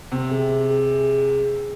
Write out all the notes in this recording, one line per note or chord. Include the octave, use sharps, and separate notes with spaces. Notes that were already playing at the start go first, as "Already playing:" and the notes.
C3 G5
G#4
G#4
G#4
G#4
G#4
G5
C5